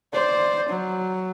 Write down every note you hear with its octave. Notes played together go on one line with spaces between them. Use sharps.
C5 D5
F#3